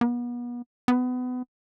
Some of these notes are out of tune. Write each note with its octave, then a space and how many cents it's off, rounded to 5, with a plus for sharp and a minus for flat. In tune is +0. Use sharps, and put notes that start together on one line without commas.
B3 -35
B3 +25